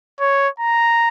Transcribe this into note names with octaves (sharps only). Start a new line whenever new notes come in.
C#5
A#5